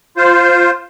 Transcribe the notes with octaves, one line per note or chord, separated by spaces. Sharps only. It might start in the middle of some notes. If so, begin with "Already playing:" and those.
F4 C5